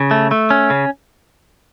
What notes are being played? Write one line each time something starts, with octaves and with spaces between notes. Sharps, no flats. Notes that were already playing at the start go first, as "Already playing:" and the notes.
Already playing: C#3
A3
A3
C#4
C#3